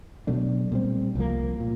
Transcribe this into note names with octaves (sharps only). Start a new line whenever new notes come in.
B2 F#3 A3 D4
A#2 G3 C4
C2 C3 F3 A#3
A#2